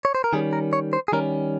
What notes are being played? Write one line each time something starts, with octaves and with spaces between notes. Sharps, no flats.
C#5
C5
A#4
D#3 G3 C#4 G#4
A#4
C#5
C5
G#4
D#3 G3 C#4 A#4